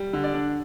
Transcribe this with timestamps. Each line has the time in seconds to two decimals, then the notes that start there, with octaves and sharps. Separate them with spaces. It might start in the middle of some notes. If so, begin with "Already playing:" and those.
Already playing: G3
0.13 D3
0.24 D5
0.34 D4